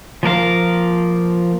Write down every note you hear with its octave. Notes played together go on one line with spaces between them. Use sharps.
F3 A#3 A#4 F5